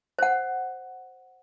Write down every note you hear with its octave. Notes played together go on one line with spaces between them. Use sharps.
C5 F#5